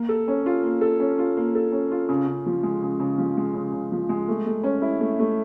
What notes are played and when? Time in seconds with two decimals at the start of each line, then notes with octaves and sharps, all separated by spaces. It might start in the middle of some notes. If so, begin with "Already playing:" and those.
Already playing: A#3
0.09 A4
0.28 C#4
0.46 F4
0.63 A#3
0.81 A4
1.00 C#4
1.19 F4
1.37 A#3
1.55 A4
1.72 C#4
1.91 F4
2.09 C#3
2.27 C#3
2.46 F3
2.63 G#3
2.82 C#3
3.00 C#3
3.18 F3
3.37 G#3
3.54 C#3
3.73 C#3
3.92 F3
4.09 G#3
4.28 A3
4.46 A3
4.64 C#4
4.82 E4
5.00 A3
5.19 A3